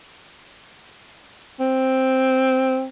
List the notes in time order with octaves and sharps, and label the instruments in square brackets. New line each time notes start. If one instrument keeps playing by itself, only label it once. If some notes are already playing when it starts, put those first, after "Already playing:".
[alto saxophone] C4